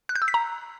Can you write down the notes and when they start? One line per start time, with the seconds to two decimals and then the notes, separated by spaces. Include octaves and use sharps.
0.09 F#6
0.16 G6
0.22 E6
0.28 B6
0.34 A#5